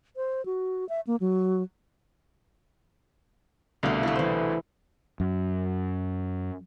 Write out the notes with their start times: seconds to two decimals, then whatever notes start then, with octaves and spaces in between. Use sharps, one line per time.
0.16 C5
0.46 F#4
0.89 E5
1.07 A#3
1.20 F#3
3.83 C2 B2 D3 A3 F5
4.03 A3 E4
4.16 E3 C5
5.20 F#2